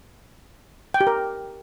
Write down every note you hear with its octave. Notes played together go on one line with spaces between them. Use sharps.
G5
G4
A#4